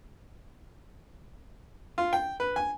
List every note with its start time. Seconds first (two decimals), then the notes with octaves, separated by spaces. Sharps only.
1.98 F4
2.13 G5
2.40 B4
2.56 G#5